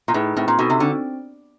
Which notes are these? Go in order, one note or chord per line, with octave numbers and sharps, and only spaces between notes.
A#2
A2 D#4 G#4 B4
A2 C4
A#2
B2 D#4 F#4 A4
C3
D3 C4